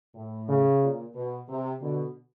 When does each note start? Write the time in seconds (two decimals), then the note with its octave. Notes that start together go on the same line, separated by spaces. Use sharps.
0.15 A2
0.48 C#3
0.82 A#2
1.15 B2
1.49 C3
1.82 B2 D3